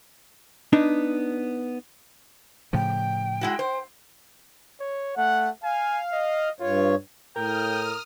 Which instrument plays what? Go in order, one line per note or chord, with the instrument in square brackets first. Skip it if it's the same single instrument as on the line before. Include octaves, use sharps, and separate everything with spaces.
[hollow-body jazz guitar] B3 D4 D#4
[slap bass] A2 C#3 F3 [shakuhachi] G5
[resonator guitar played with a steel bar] G#3 E4 F#4
C5
[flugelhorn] C#5
[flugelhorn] A3 [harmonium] F#5
[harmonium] F5 [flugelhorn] G#5
[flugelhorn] D#5
[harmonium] G2 C#5 [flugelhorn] F4
[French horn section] A2 [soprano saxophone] A#4 [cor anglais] G5 [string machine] D#6 F6